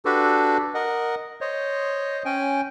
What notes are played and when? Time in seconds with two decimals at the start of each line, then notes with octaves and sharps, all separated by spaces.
0.05 D4 F#4 G4 A4 B4
0.74 A#4 D#5 F#5
1.41 C5 C#5 D#5
2.25 C#4 G5 G#5